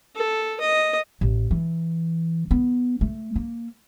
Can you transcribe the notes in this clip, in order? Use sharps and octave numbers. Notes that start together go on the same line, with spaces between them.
A4
D#5
A1
E3
B3
A3
A#3